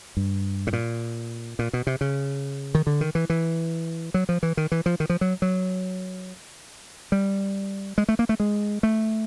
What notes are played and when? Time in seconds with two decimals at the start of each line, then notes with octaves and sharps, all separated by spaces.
0.17 G2
0.67 A2
0.73 A#2
1.59 A#2
1.73 B2
1.87 C3
2.01 C#3
2.75 D#3
2.87 D3
3.01 D#3
3.15 E3
3.30 E3
4.14 F#3
4.29 F3
4.43 E3
4.57 D#3
4.72 E3
4.86 F3
5.00 D#3
5.10 F3
5.21 F#3
5.42 F#3
7.12 G3
7.98 G#3
8.09 A3
8.19 A#3
8.29 A3
8.40 G#3
8.83 A3